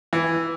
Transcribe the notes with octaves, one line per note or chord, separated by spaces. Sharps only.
E3